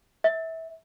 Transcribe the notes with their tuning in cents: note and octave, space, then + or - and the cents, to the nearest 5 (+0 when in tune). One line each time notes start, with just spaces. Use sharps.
E5 -25